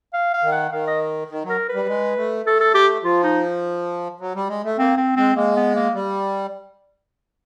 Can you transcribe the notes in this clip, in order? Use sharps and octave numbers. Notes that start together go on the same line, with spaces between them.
F5
F5
D#3
F#5
D#3 F5
D#5
D#3
F#3 A#4
B4
G3
G#3
A3
A3 A4
A4
G4
F3 F4
D#4
F#3
G3
G#3
A3
A#3 C4
C4
G#3 C4
G#3 A#3
B3
A#3
G3